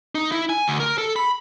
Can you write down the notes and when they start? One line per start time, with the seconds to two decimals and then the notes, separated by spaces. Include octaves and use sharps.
0.15 D#4
0.32 E4
0.49 G#5
0.68 D2
0.80 A#4
0.98 A4
1.16 B5